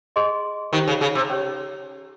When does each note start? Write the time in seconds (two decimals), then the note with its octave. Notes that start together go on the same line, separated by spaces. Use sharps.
0.16 G#4 D#5 G#5 C6
0.72 D#3 G4 C5 G5
0.88 C#3
1.01 C#3
1.15 C3
1.30 C#4 G4 C#5